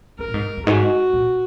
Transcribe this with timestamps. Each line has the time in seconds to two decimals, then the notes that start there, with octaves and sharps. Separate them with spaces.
0.18 F#2 A#4
0.28 A#2
0.34 G#2
0.57 F#2
0.66 G#2 F#4
1.13 A#2